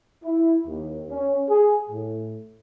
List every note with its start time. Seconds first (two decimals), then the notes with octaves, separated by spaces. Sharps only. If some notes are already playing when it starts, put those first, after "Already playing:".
0.24 E4
0.67 D#2
1.10 C#4
1.48 G#4
1.89 A2